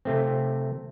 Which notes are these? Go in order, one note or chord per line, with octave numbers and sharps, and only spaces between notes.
C3 A3 C4